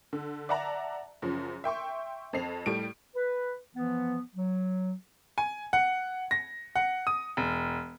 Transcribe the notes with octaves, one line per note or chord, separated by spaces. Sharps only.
D3
D5 E5 F#5 A5 A#5
F#2 C#3 F3
E5 G5 C6 C#6
F2 C4 C7 F7
A2 G3 D7
B4
E3 F3 B3
F#3
G#5
F#5
A#6
F#5
D#6
E1